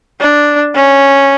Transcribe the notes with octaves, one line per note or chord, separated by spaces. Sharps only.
D4
C#4